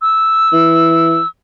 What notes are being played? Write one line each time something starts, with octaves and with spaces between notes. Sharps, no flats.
E6
E3